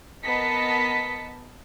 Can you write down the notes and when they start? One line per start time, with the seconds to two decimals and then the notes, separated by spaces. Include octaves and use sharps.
0.25 B3 A#4 D#5 A5 B6 C#7